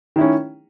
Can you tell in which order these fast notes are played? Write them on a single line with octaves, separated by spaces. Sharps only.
D#3 E4 C#4